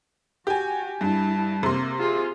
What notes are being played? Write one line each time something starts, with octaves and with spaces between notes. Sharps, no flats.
F#4 G4 G#5
G2 E4 A5
C3 A#3 C6
F4 G#4